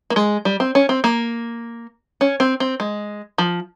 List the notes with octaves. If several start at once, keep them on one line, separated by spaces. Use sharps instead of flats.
A#3
G#3
G3
C4
C#4
C4
A#3
C#4
C4
C4
G#3
F3